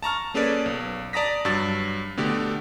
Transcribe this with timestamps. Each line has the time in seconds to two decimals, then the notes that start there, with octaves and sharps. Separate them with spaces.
0.03 A5 A#5 C#6 F6
0.34 A#3 C#4 G#4 A4 B4 D5
0.66 B1
1.13 D5 A5 A#5 D#6 A#6 B6
1.45 G2 F#3 E6 A6
2.17 B2 D3 A3 G4